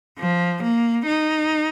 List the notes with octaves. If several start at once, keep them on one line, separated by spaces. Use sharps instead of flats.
F3
A#3
D#4